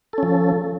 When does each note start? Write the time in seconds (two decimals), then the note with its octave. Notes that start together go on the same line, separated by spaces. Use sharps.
0.13 A4
0.18 C#4
0.23 F3